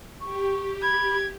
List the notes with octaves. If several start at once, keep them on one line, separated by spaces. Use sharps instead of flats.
G4 C#6
B5 G#6